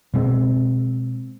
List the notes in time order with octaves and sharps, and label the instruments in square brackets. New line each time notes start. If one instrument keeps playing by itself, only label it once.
[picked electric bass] B2 G#3 B3 C4